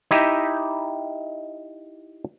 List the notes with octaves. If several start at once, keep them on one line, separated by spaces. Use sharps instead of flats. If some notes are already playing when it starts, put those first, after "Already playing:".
D#4 E4 G4 D#5 E5